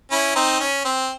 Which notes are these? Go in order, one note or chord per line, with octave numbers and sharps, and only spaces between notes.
C#4 E4
C4 D#4
C#4
C4